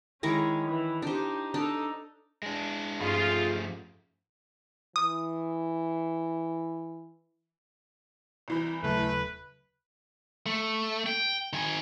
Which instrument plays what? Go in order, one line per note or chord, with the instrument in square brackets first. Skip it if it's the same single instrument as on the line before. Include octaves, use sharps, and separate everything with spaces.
[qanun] D#3 E4 A#5 [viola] G#3 C#4
[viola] E3
[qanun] D4 C5 [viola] D#4 G4
[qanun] D4 [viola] D#4 A4
[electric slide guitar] G#3 D4
[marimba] G2 C#4 D#4 [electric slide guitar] F3 A3 [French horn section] F4 [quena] G#4
[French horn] E3 [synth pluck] D#6
[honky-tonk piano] C2 E3 B5
[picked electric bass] D#1 C#3 F#3 [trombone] A3 [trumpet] B4
[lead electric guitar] A3
G5
D#3 G#5